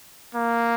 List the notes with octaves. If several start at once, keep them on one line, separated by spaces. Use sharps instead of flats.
A#3